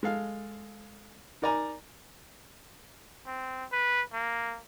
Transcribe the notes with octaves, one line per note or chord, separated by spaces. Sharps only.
G#3 A4 F5
D#4 A#4 D5 G#5 A#5
C4
B4
A#3